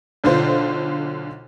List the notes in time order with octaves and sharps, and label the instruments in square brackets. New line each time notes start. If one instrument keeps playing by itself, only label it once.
[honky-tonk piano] B1 D3 F4 C5